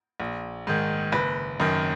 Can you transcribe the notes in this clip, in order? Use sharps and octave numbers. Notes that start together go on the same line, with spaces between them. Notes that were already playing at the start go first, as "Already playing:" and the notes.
A#1
G#2 D#3
F#1 B4
F#2 D#3